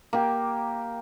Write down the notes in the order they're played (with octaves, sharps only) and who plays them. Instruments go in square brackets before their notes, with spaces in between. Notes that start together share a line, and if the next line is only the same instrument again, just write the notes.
[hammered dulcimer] A#3 G4